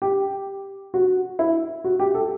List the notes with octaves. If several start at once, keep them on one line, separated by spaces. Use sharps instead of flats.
G4
F#4
E4
F#4
G4
A4